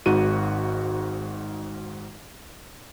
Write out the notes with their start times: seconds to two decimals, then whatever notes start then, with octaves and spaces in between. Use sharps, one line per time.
0.06 G#1 G#2 F#4 D#7